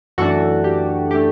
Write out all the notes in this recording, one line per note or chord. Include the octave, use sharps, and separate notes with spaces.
F#2 E3 A3 D4 F#4 A4
G4
E3 A3 D4 G4